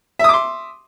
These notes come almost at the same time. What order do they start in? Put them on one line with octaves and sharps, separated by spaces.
E5 D#6 D6 C6